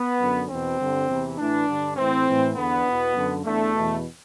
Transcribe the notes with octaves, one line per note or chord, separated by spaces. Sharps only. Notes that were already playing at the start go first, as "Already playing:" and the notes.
Already playing: B3
F#2 D3
E2 B2 C4
G2 D3
E2 C3 E3
A2 E3 D4
G2 D3
A2 E3 C4
A2 E3
E2 D3 B3
E2 B2
F#2 D3
E2 D3 A3
E2 B2